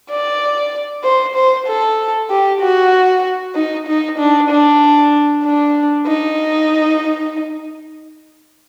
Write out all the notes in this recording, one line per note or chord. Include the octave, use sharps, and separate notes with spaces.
D5
C5
C5
A4
G4
F#4
D#4
D#4
D4
D4
D4
D#4